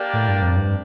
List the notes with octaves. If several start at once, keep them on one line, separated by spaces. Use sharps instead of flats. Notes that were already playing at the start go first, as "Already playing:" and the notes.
Already playing: A#3 D4 G4 A#4 D5
A2
G2
F2
G2